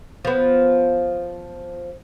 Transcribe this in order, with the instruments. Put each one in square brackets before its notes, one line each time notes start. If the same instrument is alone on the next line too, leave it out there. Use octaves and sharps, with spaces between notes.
[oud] F3 B3